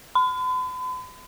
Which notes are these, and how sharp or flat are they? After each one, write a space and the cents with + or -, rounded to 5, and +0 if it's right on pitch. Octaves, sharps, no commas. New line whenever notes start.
B5 +45